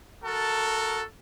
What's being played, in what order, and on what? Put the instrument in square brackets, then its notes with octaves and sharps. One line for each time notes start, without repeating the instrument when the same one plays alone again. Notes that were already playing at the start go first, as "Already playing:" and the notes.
[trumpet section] F#4 A4 A#4 A5